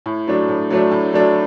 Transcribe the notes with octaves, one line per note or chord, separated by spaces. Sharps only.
A2
F#3 A3 D4
A2
F#3 A3 D4
A2
F#3 A3 D4